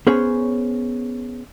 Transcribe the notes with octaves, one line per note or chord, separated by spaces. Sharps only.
B3 C#4 G#4 C5 C#5